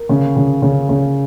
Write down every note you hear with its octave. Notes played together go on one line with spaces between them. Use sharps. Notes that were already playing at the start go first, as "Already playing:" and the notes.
Already playing: A#4
C#3
C#3
C#3
C#3